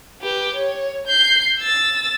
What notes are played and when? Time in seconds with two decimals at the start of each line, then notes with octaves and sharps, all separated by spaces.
0.22 G4 B4
0.55 C#5
1.07 G6 C7
1.60 E6 A6